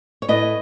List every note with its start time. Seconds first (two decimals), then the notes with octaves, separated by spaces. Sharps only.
0.22 C#5
0.28 A2 B4 D#5